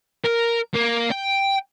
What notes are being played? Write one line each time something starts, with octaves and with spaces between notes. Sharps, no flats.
A#4
A#3
G5